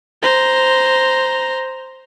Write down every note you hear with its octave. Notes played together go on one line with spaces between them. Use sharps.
C5 A#5